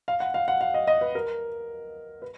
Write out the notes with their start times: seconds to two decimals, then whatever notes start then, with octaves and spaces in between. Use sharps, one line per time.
0.08 F5
0.20 F#5
0.34 F5
0.48 F#5
0.61 F5
0.74 D#5
0.87 D#5
1.01 B4
1.15 A#4
2.22 B4